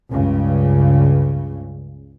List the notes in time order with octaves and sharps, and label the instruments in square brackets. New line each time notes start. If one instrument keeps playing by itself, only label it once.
[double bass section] C#2 G2 C#3